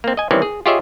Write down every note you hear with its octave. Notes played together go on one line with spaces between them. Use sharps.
A#3 C4
D#5 G#5
D#3 E3 G3 C4 C#4
G#4
F4 G4 G#4 C#5 D#5 E5